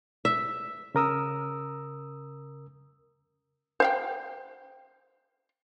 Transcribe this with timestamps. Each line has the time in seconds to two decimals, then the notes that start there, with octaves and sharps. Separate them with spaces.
0.25 E5
0.95 C#3 A#4 D#6 E6
3.80 C5 F5 G5